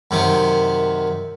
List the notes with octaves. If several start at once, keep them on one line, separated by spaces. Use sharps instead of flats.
F#2 C3 D#3